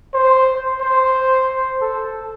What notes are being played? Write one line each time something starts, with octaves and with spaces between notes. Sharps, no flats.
C5
C5
A4